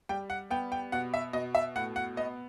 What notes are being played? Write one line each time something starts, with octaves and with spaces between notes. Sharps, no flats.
G3 G5
F#5
B3 G5
G5
B2 F#5
E5
B2 D#5
E5
A2 F#5
F#5
B3 D#5